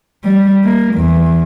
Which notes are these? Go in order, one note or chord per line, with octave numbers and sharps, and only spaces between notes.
G3
A#3
E2